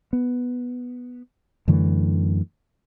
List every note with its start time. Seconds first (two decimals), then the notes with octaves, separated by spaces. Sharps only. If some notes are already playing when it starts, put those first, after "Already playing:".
0.13 B3
1.68 F#2 D3 E3 A3